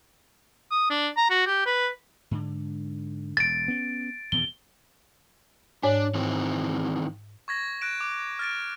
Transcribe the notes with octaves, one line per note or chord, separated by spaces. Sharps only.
D#6
D4
A#5
F#4
G4
B4
G#2 D3
E1 A6 D7
B3 C#4
E2 B2 D#3 G7
G#2 D4 C#5
D#3 E3 C4
C#6 G#6 A#6
F#6 A#6 D7 E7
D6
F6 A6 D7